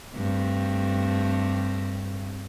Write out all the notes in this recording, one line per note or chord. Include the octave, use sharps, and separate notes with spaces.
G2 A3 C4